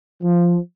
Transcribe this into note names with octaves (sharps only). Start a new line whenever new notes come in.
F3